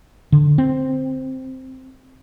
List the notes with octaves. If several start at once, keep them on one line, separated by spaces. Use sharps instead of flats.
D3
C4